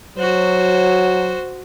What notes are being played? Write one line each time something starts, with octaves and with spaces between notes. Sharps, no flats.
F#3 F#4 C5